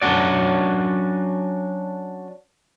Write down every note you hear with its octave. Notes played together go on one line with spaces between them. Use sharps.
F#3 C#4 D4 F#4 D5